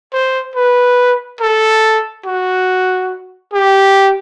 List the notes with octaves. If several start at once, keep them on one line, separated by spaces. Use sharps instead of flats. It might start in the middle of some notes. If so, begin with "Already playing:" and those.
C5
B4
A4
F#4
G4